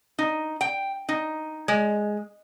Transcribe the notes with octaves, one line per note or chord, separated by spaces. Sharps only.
D#4
G5
D#4
G#3